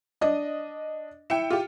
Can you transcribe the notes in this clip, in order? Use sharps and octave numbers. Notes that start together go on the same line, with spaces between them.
D4 D#5
E4 G5 C#7 E7
F4 G4